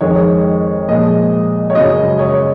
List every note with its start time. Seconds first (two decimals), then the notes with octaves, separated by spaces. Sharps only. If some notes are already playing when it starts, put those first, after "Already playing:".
0.01 F2 D#3 G#3 C#5
0.88 A#2 F3 G#3 D#5
1.70 C#5
1.75 F#2 C#3 G#3 D#5
2.19 C#5